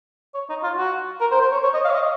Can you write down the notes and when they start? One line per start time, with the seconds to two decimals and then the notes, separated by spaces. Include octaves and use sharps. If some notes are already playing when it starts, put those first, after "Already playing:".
0.35 C#5
0.49 D#4
0.63 F4
0.78 F#4
1.20 A#4
1.31 C5
1.41 C5
1.52 C#5
1.63 C#5
1.74 D#5
1.85 F5
1.90 C#5
1.95 D#5